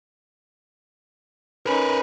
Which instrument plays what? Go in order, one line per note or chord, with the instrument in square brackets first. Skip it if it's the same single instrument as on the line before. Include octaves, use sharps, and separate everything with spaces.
[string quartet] C#4 D#4 [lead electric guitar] A#4 B4